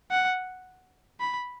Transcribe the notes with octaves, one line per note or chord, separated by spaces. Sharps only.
F#5
B5